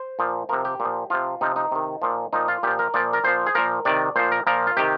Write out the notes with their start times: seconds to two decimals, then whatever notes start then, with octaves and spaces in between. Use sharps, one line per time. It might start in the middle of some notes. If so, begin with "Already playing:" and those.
Already playing: C5
0.19 A#2 F3
0.49 C3 F3 A#4
0.65 G4
0.80 A#2
0.85 F3
1.10 C3 F3 F4
1.41 C3 F3 D#4
1.56 D#4
1.72 C3 D#3
2.02 A#2 F3
2.33 A#2 F3 D#4
2.48 F4
2.63 A#2 F3 G4
2.79 A#4
2.94 A#2 F3 D5
3.13 A#4
3.24 A#2 F3 C5
3.46 G#4
3.55 A#2 F3 A#4
3.85 C3 D#3 D5
4.16 A#2 F3 C5
4.32 A#4
4.47 A#2 F3 A#4
4.67 F4
4.77 C3 D#3 G4